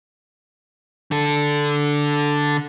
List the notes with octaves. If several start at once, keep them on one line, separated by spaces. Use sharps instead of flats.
D3 A4